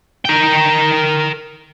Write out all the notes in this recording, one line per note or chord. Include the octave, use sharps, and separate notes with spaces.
A#4 G5